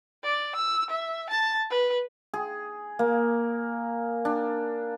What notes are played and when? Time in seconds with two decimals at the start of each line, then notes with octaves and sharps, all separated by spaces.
0.24 D5
0.56 E6
0.91 E5
1.30 A5
1.71 B4
2.34 G#4
2.99 A#3
4.25 D4